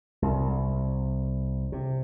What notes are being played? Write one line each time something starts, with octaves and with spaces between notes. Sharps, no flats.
C2
C3